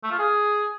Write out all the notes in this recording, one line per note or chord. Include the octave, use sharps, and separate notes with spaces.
A3
F4
G#4